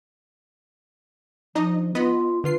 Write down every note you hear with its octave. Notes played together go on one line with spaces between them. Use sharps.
F3 D4 D#4 D#5
B3 F4 D#5 B5
D3 F4 B4 C7